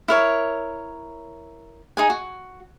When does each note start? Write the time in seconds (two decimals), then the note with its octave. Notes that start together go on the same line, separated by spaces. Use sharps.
0.08 E4 A#4 C#5
1.97 D#4 G#4 G#5
2.10 F#4